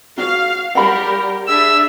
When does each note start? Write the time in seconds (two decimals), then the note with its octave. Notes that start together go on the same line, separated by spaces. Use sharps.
0.18 F#4 F5
0.75 G3 G4 A#4 F#5 B5
1.48 D4 G#4 E5 E6